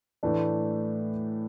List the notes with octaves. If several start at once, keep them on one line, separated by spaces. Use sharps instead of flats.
A2 E3 A3 D4